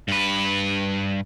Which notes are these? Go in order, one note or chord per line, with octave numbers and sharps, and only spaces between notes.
G2 B4